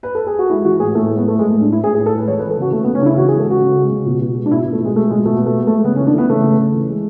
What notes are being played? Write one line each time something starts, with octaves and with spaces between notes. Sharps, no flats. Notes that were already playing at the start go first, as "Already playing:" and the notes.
B4
A4
G#4
F#4
G#3 E4
E3 F#4
A2 G#4
A2 A3
A3
G#3
B3
A2 A3
A2 G#3
A3
G#3
D4
A2 E4
A2 G#4
G#4
A2
A4
G#3 B4
E3 C#5
B4
E3
A4
C#3 F#4
C#3 A3
B3
C#3
C#4
C#3 D4 E4
E3 F#4
G#4
G#3
A4
C#3 F#4
C#3
G#3
C#3
B2
B2
G#3
D4
B2 E4
B2
A3
B2 G#3
G#3 A3
B2 G#3
B2 A3
B2 B3
A3
G#3 B3
A3
G#3
C#3 B3
C#4
E3
D4
E3 A3 B3
C#3 A3
C#3
C#3
E3
G#3